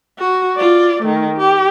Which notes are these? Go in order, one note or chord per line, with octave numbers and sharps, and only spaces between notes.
F#4
F4 D5
D#3 A3
G4